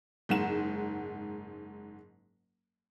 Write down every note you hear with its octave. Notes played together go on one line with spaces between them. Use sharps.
F#1 G#2 F#5 E7